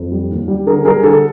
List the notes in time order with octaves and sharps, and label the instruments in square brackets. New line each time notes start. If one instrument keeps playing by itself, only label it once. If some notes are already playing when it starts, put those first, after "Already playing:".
Already playing: [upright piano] F2
G3
D#2
G3
D3 G#4 A#4
G3 G#4 A#4
D3 A4